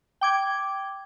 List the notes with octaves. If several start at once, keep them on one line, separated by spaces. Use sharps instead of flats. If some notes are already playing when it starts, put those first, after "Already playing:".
G5 D6 G#6